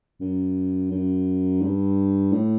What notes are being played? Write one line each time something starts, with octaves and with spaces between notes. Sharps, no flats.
F#2
F#2
G2
A2